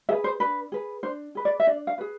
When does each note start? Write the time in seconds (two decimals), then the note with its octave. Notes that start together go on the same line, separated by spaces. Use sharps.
0.09 G#4 B4 E5
0.24 C5
0.40 D4 B4
0.72 G#4 B4
1.03 D4 C5
1.35 G#4 B4
1.45 D5
1.60 E5
1.67 D4 D5
1.87 F5
1.98 G#4 B4